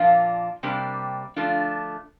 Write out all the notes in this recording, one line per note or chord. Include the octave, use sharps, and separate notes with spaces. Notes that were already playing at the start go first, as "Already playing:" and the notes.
Already playing: A#2 F3 A#3 D4 F4
C3 G3 A#3 D4 G4
D3 F3 A3 D4 F4